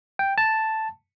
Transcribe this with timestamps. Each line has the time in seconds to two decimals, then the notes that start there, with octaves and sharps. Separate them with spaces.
0.19 G5
0.38 A5